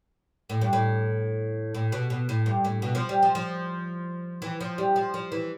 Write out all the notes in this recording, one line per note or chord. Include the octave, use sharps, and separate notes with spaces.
A2
G2
A2
A2
B2
B2
A2
G2
A2
B2
F3
G3
F3
F3
E3
F3
G3
F3
F3
E3